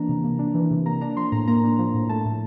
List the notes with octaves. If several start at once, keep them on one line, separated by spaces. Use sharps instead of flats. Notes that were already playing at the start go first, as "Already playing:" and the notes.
Already playing: E3 A#3 D4 A#5
C3
A#3
D4
E3
C3
A#3 A#5
D4 A#5
F3 C6
A2 A#5
A#3 A#5
D4
F3
A2
A3 A5
A2